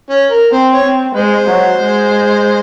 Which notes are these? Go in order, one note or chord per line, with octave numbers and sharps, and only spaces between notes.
C#4
A#4
C4 C5
C#5
C4
G#3 C5
F#3
G#3